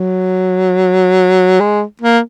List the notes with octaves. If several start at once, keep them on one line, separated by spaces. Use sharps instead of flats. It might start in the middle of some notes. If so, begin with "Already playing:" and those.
Already playing: F#3
G#3
A#3